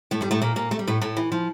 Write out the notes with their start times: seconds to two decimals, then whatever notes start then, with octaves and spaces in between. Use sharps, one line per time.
0.11 A2 A3
0.21 G2 G3
0.31 A2 A3
0.42 A#2 A#3
0.56 A#2 A#3
0.71 A3
0.79 G3
0.87 A2 A3
1.01 A2 A3
1.17 E3
1.32 F3